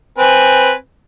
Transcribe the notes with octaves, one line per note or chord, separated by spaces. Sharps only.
C4 B4 G#5